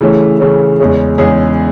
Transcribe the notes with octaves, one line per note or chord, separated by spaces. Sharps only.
C#3 E3 A3 C#4
C#3 E3 A3 C#4
E2 C#3 G#3 C#4 G#4
E2 C#3 G#3 C#4 G#4